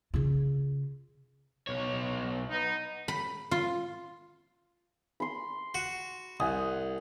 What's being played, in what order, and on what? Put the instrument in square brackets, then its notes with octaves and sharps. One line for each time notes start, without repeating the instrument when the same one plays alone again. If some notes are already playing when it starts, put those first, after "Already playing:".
[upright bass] C#3 F4
[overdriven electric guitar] B1 C#5
[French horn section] B3 D#4
[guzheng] B5
F4
[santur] B5 C6
[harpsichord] F#4
[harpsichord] C2 [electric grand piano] F#5 G#5 D#6